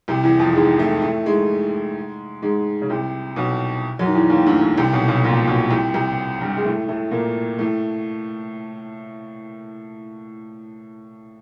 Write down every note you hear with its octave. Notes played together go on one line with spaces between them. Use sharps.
C2 C3
E2 E3
F2 F3
G#2 G#3
A2 A3
A2 A3
G#2 G#3
G#2 G#3
C#3
C2 C3
B1 B2
F#2 F#3
D#3
E2 E3
D#2 D#3
D2 D3
D2 D3
C2 C3
B1 B2
B1 B2
A#1 A#2
B1 B2
C2 C3
C2 C3
G2 G3
G#3
A2 A3
A2 A3
A#2 A#3
A2 A3